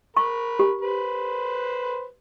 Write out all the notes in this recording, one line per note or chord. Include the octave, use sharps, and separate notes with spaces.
A#4 B5 C#6
G4
B4 C5